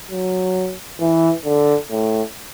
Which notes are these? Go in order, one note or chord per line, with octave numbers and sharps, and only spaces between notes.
F#3
E3
D3
A2